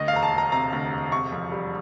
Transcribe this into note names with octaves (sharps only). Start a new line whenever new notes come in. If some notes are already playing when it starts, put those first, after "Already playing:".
Already playing: D2 D#5
F5
E1 A#5
A5
E1
A#5
C3 A#5
D2
E1
C3 C#6
F2
G3